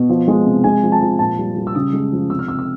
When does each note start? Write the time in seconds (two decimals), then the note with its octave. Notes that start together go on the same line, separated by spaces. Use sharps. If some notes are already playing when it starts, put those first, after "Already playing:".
Already playing: B2
0.09 F3
0.28 G#3
0.46 C3
0.64 G#3 G#5
0.83 F3
0.92 A5
1.01 F3
1.19 A#2 A5
1.39 G3
1.56 G3
1.67 E6
1.75 C#3 D#6
1.93 G#3
2.12 F3
2.30 C3 E6
2.39 F6
2.48 C3 E6
2.59 E6